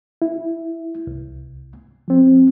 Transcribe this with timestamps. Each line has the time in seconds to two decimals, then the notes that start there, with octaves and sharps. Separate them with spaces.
0.22 E4
1.07 C2
2.08 F3 C4